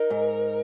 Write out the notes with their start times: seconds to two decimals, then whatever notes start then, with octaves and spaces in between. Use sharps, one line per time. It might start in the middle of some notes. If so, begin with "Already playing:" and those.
Already playing: D#4 A#4
0.10 G#2